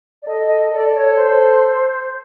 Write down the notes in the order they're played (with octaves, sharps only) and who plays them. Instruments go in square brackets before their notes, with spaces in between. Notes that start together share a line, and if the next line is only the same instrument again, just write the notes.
[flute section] D5
[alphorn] A4 [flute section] D#5
[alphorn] A4 [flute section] D5
[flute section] D5
C#5
C5